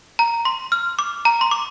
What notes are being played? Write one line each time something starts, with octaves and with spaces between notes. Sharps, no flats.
A#5
C6
F6
D6
A#5
C6
D6